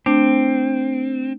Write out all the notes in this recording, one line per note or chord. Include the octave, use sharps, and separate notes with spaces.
A3 C4 D4